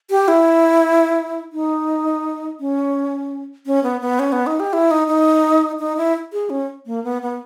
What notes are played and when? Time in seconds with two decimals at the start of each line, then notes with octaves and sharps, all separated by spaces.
0.10 G4
0.28 E4
1.53 D#4
2.60 C#4
3.66 C#4
3.83 B3
4.01 B3
4.19 C#4
4.32 B3
4.47 D#4
4.60 G4
4.73 E4
4.91 D#4
5.08 D#4
5.79 D#4
5.97 E4
6.33 G#4
6.50 C#4
6.86 A#3
7.04 B3
7.22 B3